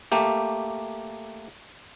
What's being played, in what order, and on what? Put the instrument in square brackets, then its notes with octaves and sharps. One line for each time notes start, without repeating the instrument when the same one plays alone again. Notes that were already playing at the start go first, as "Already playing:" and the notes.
[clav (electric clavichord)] A3 A#3 G4